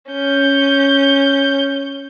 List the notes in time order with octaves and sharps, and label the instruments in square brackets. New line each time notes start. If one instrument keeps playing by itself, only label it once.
[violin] C#4 G6